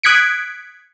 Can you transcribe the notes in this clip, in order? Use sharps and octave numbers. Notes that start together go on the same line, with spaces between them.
D#6 F#6 G#6 B6 C#7 D7